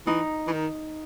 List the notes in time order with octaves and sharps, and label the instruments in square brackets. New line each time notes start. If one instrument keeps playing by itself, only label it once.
[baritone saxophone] E3 [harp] D#4
[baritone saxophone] E3
D#3